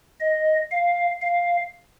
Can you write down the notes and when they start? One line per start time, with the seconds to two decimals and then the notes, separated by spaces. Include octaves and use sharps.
0.20 D#5
0.71 F5
1.21 F5